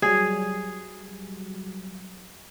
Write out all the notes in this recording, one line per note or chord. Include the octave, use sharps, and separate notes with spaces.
F#3 G3 G#4